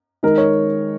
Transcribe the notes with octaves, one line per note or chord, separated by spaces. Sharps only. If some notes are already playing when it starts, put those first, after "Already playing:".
D#3 G#3 D#4 A#4
C#5